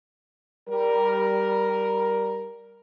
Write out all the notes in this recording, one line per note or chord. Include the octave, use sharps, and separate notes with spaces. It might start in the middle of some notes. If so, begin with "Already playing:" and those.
G3 A#4